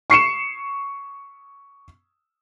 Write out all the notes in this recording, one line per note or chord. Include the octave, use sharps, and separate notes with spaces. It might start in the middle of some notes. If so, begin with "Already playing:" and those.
C#6 C7 C#7 E7